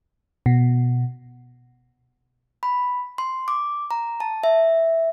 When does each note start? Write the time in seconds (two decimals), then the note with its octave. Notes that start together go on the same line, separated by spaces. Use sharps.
0.46 B2
2.63 B5
3.18 C6
3.48 D6
3.91 A#5
4.20 A5
4.44 E5